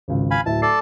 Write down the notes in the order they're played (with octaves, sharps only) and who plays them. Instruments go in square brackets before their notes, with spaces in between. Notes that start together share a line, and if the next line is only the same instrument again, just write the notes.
[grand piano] G#1 C#2
[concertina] F5 G#5 B5
[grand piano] D1 E4 E5 [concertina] A5
[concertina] A4 D5 A5 [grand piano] C7